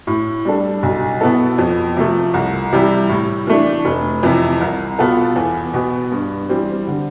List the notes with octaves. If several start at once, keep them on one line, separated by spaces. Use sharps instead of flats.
A2
G3 D4 A4
B1
B2 B3 E4 A4
F2
C3 F3 A3
C2
C3 E3 G3
A2
E3 A3 D4
F1
F2 C3 E3
C2
B2 B3 F4 A4
E2
B2 B3
G2
E3 G3 C4
D3